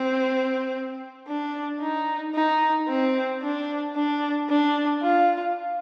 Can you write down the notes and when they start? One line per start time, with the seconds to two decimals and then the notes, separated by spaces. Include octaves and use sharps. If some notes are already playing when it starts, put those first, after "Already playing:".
Already playing: C4
1.28 D4
1.81 D#4
2.35 D#4
2.88 C4
3.42 D4
3.95 D4
4.49 D4
5.02 F4